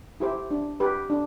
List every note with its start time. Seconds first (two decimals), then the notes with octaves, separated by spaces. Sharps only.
0.20 E4 G4 C5
0.51 D4
0.80 G4 B4
1.10 D4